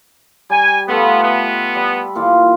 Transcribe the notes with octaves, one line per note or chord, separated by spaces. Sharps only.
G3 G#5
A3 B3 F4 A4
B3
G3 B5
A#2 E3 F4